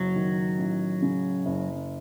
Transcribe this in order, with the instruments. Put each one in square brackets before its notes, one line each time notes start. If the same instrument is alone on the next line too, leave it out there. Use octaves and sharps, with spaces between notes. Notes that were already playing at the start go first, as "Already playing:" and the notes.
Already playing: [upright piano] F#1 [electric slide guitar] F#3
[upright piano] D#3
A1
C#3
F#1